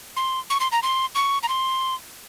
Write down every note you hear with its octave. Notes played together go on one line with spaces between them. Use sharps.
C6
C#6
C6
A#5
C6
C#6
A#5
C6